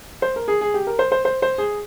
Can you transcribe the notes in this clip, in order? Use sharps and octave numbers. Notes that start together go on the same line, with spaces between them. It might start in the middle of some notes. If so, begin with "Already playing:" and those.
C5
A#4
G#4
G#4
G4
A#4
C5
C5
C5
C5
G#4